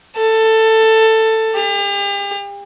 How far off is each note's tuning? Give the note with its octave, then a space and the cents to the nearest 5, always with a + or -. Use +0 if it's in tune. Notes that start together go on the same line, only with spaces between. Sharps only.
A4 +15
G4 +40